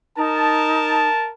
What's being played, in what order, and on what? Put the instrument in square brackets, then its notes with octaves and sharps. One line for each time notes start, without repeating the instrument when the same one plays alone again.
[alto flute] D#4 [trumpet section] A#4 A5